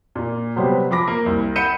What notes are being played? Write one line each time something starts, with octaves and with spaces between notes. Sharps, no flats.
A#2
C3 F#3 G3 B3 C5
F3 B5 D6 A#6
A#3
C2
F#5 B5 G6 C#7 D#7 E7